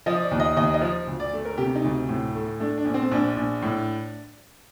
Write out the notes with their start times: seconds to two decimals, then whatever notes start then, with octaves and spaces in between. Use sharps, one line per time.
0.06 F3 D#5
0.22 D5
0.31 D#2
0.40 D#5
0.56 D#2 D#5
0.74 D#5
0.81 F3
1.07 D2
1.20 D5
1.33 A3
1.45 A#4
1.58 C3 G4
1.75 D#4
1.84 D2
2.09 A2
2.35 A3
2.60 A3 D4
2.78 D4
2.85 A#1
2.94 C4
3.11 A#1 D4
3.37 A#1
3.62 A2